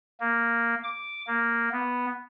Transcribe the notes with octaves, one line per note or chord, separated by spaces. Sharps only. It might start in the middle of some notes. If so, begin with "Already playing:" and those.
A#3
D6
A#3
B3